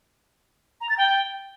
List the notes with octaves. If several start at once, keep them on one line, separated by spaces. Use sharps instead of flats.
A#5
A6
G5